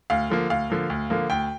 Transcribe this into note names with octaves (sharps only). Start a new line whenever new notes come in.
D2 F5
D3 F3 A#3
D2 F5
D3 F3 A#3
D2
D3 F3 A#3
D2 G5